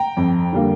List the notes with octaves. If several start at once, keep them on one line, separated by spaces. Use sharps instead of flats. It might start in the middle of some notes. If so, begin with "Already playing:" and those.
Already playing: G5 A#5
F2
D3 G3 A#3